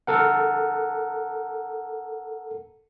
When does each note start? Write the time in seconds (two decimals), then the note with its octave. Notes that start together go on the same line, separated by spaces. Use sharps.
0.07 A4 A#4 F#5